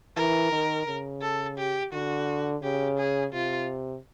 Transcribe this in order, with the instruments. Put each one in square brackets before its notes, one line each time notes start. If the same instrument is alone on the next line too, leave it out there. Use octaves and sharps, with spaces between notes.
[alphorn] E3 [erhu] A#4
[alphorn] D#3
C#3
[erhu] A4
G4
[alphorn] D3 [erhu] F#4
[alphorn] C#3 [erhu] G4
[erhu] G#4
[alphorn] C3 [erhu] F4